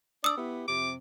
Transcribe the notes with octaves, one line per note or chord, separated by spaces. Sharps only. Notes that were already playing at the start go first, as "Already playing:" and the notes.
D4 D5 D#6 E6
B3 E4 G4
F2 C3 D6